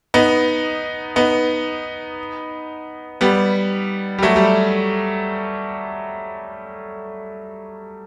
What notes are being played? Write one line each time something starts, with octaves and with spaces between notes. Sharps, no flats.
B3 D#4
B3 D#4
G3 B3
G3
F#3 A3
G3